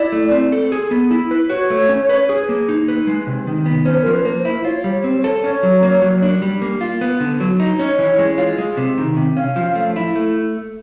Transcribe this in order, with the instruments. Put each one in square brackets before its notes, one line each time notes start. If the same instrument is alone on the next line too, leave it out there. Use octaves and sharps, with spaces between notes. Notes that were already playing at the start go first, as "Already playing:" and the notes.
Already playing: [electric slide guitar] E4 [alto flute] D5
[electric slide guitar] A3
C4
A4
G#4
B3
E4
B4
[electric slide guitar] F#4 [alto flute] C#5
[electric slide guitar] A3
C#4
B4
G#4
A#3
D#4
B4
G#3
C3
D#3
B3
[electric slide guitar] C#4 [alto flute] C5
[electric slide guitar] F3 [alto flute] A#4
[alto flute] B4
[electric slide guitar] A#3
[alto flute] C5
[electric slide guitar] E4
[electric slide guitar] F4 [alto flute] C#5
[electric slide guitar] G3
[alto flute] C#5
[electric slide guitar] C4
[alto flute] C#5
[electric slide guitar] A4
[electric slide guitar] C#4 [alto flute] C#5
[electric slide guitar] F#3
A#3
F#3
D4
G3
A#3
F4
B3
D3
F#3
D#4
[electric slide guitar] C#4 [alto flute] C#5
[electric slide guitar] E3
G#3
F4
G#3
C3
D#3
C3
[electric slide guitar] C#4 [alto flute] F5
[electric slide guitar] F3
A3
E4
A3